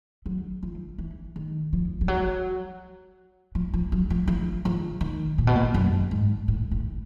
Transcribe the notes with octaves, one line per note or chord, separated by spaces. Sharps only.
F#3
F3
E3
D#3
F3
F3
F#3
F3
F3
F#3
F3
F3
F3
D#3
A#2
B2
A#2
F#2
G#2
A2
A2